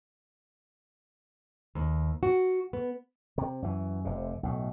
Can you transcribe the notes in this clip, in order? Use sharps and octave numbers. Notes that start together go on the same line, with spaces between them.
D#2
F#4
B3
C3
F#2 E3
F1 C3
B1 A2